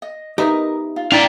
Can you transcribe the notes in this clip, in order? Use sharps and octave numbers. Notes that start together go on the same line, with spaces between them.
D#5
B3 D#4 G4 A#4 D#5 E5 D#6
F4
D4 E4 D5 F5 G5 A#5